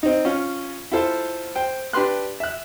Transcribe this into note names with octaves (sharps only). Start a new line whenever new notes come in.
C4 D#4
C#4 F4
E4 F4 A4 C5 F5
C5 G5
D4 G4 B4 C6 F#6
E5 F#6